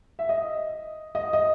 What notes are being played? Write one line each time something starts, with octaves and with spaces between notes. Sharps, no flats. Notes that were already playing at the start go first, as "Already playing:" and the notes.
E5
D#5
D#5
D#5